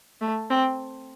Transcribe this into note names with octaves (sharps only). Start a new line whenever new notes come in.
A3
C4